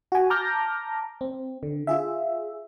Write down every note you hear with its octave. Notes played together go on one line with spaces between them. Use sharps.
F#4 G#5
A5 A#5 D6 F6 G6 A#6
C4
D3
F4 G#4 E5